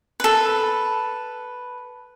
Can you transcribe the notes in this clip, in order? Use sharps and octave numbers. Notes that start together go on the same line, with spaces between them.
A4 B4